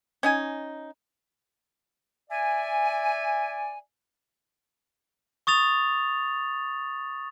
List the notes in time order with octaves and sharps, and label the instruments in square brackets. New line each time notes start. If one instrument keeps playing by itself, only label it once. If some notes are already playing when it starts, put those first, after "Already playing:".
[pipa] C#4 D#4 G#5
[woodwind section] D5 E5 G#5
[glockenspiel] C#6 D#6 A6 F7